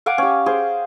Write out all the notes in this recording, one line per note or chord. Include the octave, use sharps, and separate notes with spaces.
F5 F#5 G#5 D6
C#4 G4
G#4 C5